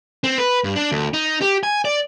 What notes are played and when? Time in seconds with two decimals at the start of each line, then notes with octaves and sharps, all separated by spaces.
0.24 C4
0.38 B4
0.64 G2
0.76 D4
0.92 D2
1.13 D#4
1.41 G4
1.63 G#5
1.85 D5